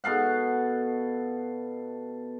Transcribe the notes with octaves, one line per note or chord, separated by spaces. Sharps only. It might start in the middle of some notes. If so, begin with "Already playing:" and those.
B2 A4 F5 F#5